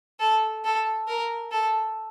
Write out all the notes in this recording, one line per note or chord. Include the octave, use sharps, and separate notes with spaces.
A4
A4
A#4
A4